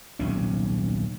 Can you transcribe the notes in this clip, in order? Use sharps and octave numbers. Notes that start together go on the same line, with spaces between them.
D#1 B1 C3 C#4